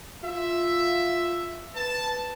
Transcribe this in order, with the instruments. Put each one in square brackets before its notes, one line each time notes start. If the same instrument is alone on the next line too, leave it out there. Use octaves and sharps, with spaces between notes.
[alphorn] F4 [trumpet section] E5
[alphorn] B4 [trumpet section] A5